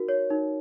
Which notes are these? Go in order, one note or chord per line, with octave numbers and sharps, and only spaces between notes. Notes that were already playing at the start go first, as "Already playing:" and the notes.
Already playing: D#4 F#4 A#4
C#5
D#4